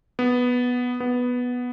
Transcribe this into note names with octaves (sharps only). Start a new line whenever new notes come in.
B3
B3